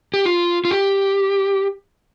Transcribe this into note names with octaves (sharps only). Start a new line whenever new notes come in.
G4
F4
F4
G4